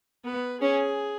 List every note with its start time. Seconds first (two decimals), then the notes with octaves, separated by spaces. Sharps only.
0.25 B3 B4
0.60 C#4 G#4